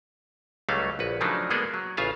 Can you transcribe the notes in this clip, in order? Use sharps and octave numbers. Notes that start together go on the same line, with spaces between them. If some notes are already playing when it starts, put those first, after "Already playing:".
C#2 F#3 G3 A3 C#4 F5
A#1 F#4 B4
C#3 F3 F#3 A3 D4 D#4
G#3 A#3 B3 G#4 A4 D5
F#3
A1 C#3 F4 G#4 E5 F5